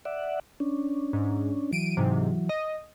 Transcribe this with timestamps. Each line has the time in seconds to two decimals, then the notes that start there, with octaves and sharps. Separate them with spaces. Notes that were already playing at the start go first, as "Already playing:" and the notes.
0.05 D5 E5 F#5
0.60 C#4 D4
1.13 G#2
1.73 E3 F#3 D7 D#7
1.97 G#2 C3
2.49 D#5